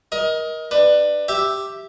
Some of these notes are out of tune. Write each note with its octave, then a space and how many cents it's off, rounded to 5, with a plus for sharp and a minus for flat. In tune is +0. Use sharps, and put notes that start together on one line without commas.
A#4 +25 D#5 +20
D4 +20 B4 +10
G4 +0 E5 +0